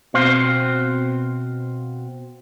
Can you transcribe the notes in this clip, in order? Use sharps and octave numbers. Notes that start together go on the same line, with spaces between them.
B2 C4 C5 F5